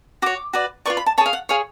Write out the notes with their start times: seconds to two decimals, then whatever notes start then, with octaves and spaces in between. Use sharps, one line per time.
0.22 F#4 C#5 D6
0.53 F#4 B4 D5
0.86 F4 B4 D5 C#6
0.97 B5
1.06 A5
1.18 C#5 A5
1.21 G#4
1.26 F5
1.33 F#5
1.49 G#4 C#5 F5